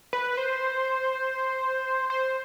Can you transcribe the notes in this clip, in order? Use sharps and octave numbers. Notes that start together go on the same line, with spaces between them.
B4
C5
C5